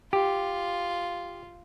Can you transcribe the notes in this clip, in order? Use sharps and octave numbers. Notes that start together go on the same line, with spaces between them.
F4 G4